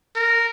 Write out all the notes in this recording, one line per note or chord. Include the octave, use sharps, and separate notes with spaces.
A#4